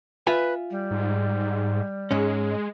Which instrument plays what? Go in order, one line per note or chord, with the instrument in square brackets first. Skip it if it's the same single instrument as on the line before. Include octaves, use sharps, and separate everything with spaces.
[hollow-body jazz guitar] F4 E5 G#5 [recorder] B4
[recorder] G3
[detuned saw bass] G#2
[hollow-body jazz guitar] G#2 C#4 [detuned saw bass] G#3